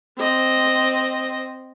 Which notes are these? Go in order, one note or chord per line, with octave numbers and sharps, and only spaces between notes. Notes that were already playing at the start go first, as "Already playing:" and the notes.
C4 D#5